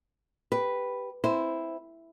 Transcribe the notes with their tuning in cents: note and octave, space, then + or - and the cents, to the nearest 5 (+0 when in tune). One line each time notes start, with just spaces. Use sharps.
G4 +0 B4 +0
C4 +0 E4 +0 C5 -10